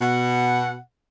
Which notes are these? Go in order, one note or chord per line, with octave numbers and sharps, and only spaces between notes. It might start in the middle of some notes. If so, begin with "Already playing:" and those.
B2 F#5